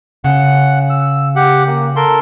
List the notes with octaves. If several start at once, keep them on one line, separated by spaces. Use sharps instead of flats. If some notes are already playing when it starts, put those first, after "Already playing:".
C#3 F#5
E6
G4 F#5
A#3
A4 A#4 C6